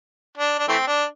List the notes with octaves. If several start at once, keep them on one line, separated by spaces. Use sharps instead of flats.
D4
D4
E3 A3 C4
D4